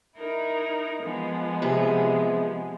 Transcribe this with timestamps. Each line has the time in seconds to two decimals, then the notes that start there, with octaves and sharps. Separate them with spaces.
0.17 D#4 E4 A#4
1.02 F3 G#3 B3
1.62 C3 G#4